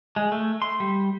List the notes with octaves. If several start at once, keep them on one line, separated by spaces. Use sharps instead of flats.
G#3
A3
C6
G3